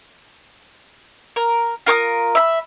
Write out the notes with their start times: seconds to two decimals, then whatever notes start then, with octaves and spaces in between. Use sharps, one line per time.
1.36 A#4
1.86 F4 A#4 C#6 D#6
2.35 E5 B5